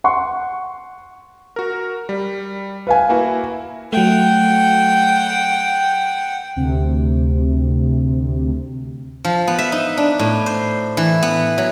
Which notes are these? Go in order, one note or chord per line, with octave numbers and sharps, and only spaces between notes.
F#5 C6 C#6
F#4 A#4
G3
B4 F5 G#5
A#3 E4 F#4
F#3 A3 F#5 G5
D2 C3
F3
B3
E5
D#4
D4
A2
C5
E3
B3
F#3